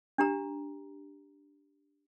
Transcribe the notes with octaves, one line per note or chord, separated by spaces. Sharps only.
D4 G4 A#5